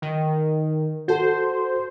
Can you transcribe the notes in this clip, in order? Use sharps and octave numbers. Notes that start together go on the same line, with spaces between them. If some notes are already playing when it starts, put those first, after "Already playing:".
D#3
F#4 A4 C5